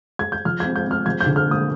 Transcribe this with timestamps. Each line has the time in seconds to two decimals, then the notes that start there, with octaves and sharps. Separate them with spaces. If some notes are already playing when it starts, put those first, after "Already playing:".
0.19 G#6
0.32 G6
0.45 F3 F6
0.60 C4 G#6
0.76 G6
0.86 C4 F6
1.06 F3 G#6
1.21 G6
1.26 D3
1.36 F6
1.46 A#3
1.51 D#6